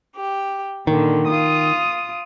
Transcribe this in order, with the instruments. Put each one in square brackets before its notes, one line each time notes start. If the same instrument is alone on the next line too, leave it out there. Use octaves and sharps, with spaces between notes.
[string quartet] G4
[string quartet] A#2 D3 [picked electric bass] D#3
[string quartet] F4 D#6